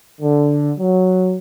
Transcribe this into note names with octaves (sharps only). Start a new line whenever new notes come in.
D3
F#3